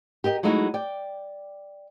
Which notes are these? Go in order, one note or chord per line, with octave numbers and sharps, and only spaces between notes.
G4 A#4 D#5 G5
F#3 G#3 A3 D#4 E4 F#4
D5 G5